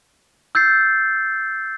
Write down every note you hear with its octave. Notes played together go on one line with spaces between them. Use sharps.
E6 G6 A6 C7